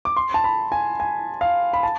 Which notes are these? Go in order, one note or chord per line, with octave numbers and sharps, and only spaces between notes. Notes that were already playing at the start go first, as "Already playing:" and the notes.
D6
C6
A5
B5
G#5
G#5
F5
B5
A5